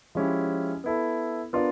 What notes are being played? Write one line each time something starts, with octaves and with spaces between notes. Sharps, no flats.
F3 G#3 C#4 E4 G4
B3 E4 A4
B3 D4 F4 A#4 D5